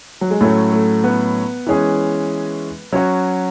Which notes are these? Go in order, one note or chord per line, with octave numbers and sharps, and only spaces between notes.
F#3
G#3
A2 F#3 A3 C#4
A3
B3
E3 G#3 C#4 G#4
F#3 C#4 F#4 C#5